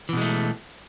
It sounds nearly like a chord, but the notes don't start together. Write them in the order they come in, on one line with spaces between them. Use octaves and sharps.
E3 B2 G#3 A3